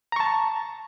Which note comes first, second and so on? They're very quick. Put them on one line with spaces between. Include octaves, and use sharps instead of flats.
A#5 C#6 A5